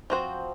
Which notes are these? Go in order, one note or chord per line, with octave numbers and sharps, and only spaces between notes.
F3 C4 F#4 C5